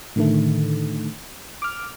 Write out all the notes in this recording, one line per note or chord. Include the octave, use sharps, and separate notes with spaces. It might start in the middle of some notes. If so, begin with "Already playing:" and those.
A2 D3 D#3 A3
D6 F6